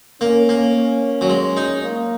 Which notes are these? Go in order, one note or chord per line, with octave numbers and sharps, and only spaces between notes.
A#3 C#4
A#3
F#3
G#3
D#4
A#3